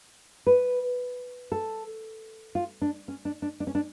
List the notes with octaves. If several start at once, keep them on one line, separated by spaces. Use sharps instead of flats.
B4
A4
F4
D4
C#4
D4
D4
D4
C#4
D4